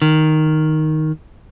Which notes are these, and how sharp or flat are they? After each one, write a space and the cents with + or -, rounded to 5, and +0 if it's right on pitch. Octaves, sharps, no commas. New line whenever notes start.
D#3 +0